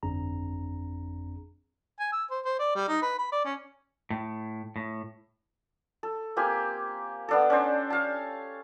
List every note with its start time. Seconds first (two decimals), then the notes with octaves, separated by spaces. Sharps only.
0.03 G1 F2 C4 D4 G#4 A#5
2.00 G#5
2.12 E6
2.30 C5
2.45 C5
2.59 D5
2.75 G3
2.88 D#4
3.02 B4
3.18 B5
3.32 D5
3.45 C#4
4.10 A2
4.76 A2
6.03 A4
6.37 A#3 C4 G4 G#5
7.28 B3 D4 A4
7.50 C#4 D4 C5
7.90 C#5 F5 A5